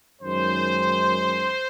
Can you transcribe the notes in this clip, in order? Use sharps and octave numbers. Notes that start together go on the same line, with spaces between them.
F#2 D#3 G#3 C5